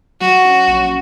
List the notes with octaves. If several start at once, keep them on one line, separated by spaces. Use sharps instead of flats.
F#3 F#4
C#4
A#1